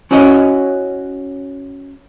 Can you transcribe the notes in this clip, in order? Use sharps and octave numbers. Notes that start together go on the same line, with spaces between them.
C#4 E4 F#4 C#5 D#5